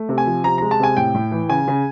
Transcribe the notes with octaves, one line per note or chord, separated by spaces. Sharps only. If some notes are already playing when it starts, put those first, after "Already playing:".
Already playing: A3
C3
G#5
F3
C3 A#5
G#3 A#5
A5
C3 G#5
A2 G5
A2
E3
C#3 G#5
C#3